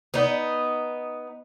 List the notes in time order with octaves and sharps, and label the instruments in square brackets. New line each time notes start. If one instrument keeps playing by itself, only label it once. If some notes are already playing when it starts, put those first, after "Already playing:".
[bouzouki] B3 D#4